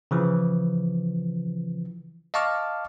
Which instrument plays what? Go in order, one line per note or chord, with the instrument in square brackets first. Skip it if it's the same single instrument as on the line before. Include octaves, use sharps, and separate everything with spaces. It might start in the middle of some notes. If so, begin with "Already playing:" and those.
[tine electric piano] C#3 E3 F3
D#5 F5 A5 C#6 D6 F6